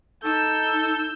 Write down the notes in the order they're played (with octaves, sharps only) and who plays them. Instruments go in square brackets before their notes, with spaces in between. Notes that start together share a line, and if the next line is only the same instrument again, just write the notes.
[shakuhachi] D#4 [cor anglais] A4 [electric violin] E6 G6